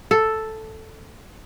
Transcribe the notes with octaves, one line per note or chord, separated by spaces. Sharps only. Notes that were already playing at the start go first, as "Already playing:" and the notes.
A4